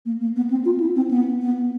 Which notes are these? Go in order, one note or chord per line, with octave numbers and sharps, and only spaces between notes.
A#3
A#3
B3
C4
F4
E4
C4
B3
B3